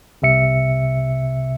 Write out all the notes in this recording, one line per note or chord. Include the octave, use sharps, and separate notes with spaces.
C2 C3 E5 C#7